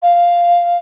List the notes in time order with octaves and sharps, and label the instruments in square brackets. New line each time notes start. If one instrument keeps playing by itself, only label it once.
[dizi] F5